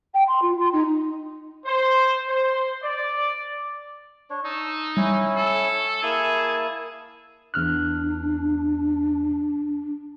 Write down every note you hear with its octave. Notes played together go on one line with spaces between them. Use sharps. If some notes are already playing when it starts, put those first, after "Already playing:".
G5
C6
F4
C6
D#4
C5
C5
D5
D4 C#5
D#4 A5 E6
G3 C#4 E4
A4
A#3 E4 G#4 A5
E2 D4 F6 F#6